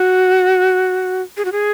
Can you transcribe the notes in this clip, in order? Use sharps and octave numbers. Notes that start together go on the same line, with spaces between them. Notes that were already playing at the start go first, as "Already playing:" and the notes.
Already playing: F#4
G#4
F#4
G#4